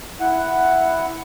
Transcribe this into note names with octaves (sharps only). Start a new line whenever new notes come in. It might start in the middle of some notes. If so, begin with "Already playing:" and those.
E4 F#5